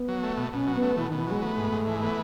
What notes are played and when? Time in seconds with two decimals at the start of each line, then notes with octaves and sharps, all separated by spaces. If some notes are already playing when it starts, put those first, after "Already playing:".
Already playing: B3
0.08 F#3
0.23 A3
0.37 B2
0.53 B2 C#4
0.67 F#3
0.75 B3
0.82 A3
0.97 B2 E3
1.09 B2 D#3
1.19 E3
1.27 F#3 G#3
1.42 A3 B3
1.58 G#2
1.72 G#2
1.87 E3
2.02 B3